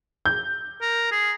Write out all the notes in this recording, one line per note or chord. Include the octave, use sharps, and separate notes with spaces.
G6
A#4
G#4